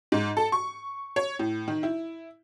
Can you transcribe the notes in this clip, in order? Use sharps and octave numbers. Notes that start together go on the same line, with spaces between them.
G#2
A4
C#6
C#5
A2
D#3
E4